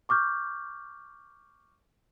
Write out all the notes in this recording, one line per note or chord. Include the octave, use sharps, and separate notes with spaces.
C#6 D6 F6 G6